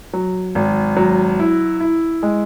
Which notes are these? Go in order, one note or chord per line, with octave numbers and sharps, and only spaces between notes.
F#3
G#1
F#3
E4
E4
G#3